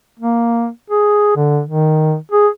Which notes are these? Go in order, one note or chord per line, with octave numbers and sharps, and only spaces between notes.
A#3
G#4
D3
D#3
G#4